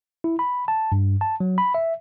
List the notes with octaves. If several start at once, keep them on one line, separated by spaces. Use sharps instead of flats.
E4
B5
A5
G2
A5
F#3
B5
E5